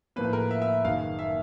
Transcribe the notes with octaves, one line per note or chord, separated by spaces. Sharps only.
A2 F3 A#3 B4
A#4
E5
E5
F#1 F#2 D#3 F5
E5